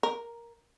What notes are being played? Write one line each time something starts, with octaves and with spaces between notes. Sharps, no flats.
A#4